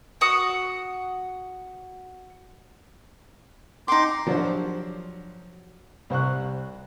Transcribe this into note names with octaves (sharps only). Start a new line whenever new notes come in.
F#4 F#5 D#6
D#4 G5 C6 D6
F3 F#3 D4 F#4 G4 C5
C2 C5 C#6 F#6